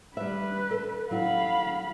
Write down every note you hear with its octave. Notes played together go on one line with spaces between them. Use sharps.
G3 B4 E5
A4
F#3 E4 F5 B5